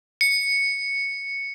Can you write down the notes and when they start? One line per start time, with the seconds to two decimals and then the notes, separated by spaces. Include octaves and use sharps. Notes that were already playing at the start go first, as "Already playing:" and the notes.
0.21 C#7